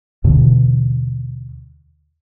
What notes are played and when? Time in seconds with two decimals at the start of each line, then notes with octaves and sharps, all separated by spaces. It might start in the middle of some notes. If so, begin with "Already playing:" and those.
0.24 D#2 B2 D3 E3